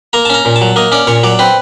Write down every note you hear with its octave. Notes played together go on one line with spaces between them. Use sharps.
A#3 A#5
A5
C#4 A#5
A#2
A5
F#3
A#3 D#5
C#4 D5
A#2 C#5
F#3 D5
C4 B4